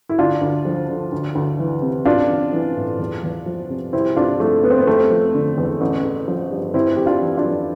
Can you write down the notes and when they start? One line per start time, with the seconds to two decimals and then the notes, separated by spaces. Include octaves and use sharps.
0.09 E4
0.18 D2 D4 F4
0.41 D2
0.65 F3
0.88 D3
1.12 D2
1.35 D2
1.59 E3
1.82 C3
2.05 A1 D4 F4
2.29 A1
2.53 E3
2.76 A2
2.99 E2
3.23 E2
3.46 F3
3.70 C3
3.93 C2 C4 E4
4.16 C2 D4 F4
4.40 F3 A3
4.63 C3 B3
4.70 C4
4.78 B3
4.87 F1 A3 C4
5.10 F3
5.34 D3
5.58 E2
5.81 A1
6.05 A1
6.28 F3
6.51 G2
6.74 F1 C4 E4
6.97 F1 G4
7.06 D4 F4
7.22 E3
7.37 D4 F4
7.45 F2